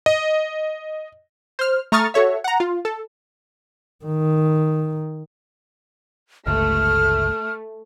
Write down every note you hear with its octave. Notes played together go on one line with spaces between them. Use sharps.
D#5
C5 F6
A3 A#5 C#6 D#6 F6 A6
F#4 A4 C#5 E5
F#5 A#5
F4
A4
D#3
G1 C#2 A3 F6